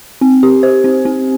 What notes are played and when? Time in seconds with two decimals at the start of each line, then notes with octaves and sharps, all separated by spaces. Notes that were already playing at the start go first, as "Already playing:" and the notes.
0.21 C4
0.43 G4
0.63 C5
0.84 C4
1.05 C4